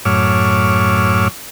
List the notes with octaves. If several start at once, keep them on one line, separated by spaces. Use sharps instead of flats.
F#2 A2 C#5 D6 E6 F6